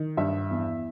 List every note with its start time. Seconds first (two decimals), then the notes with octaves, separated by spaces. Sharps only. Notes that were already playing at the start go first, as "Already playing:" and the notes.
Already playing: D#3
0.17 G2 E5
0.51 E2